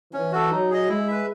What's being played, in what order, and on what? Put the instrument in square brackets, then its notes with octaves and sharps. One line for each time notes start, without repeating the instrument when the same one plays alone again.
[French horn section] E3 [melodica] C#4
[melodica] F#4 A4
[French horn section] F#3 [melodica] D#4
[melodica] G#4 D#5
[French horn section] G#3 [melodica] E4
[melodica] B4 E5